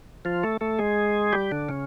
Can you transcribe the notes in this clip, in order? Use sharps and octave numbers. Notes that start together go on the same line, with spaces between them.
F3 F4
A3 A4
A3 A4
G#3 G#4
G3 G4
D3 D4
C#3 C#4